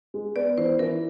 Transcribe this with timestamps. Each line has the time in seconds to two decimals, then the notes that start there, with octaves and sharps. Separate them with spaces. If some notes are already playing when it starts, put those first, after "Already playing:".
0.14 G#3
0.36 B3 D5
0.58 E3 C5
0.79 E3 A#4